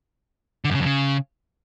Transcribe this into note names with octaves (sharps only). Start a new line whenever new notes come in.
D3
F#2
C#3
F2
C#3